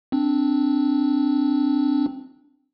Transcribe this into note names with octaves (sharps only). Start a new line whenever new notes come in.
C4 D4